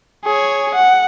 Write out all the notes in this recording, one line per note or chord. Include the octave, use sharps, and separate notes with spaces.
G#4 C#5
F#5